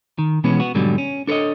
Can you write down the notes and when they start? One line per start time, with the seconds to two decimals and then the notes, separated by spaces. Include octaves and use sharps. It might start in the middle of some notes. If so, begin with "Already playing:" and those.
0.19 D#3
0.44 B2 E3 G#3 B3 C#4
0.60 B3 F#4
0.75 G#2 B2 D3 F#3 G3
0.98 C#4
1.27 D4 A4 B4 C#5 D#5